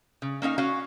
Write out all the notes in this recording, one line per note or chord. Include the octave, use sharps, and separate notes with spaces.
C#3
A#3 C#4 D#4 F5
C#4 F#4 F5